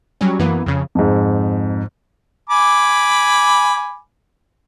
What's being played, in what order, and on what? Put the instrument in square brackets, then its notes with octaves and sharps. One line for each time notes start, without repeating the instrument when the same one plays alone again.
[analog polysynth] F#3 G3 C#4
F#2 E3 A#3 B3
F2 C#3
[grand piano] F2 G#2
[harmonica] G#5 B5 D6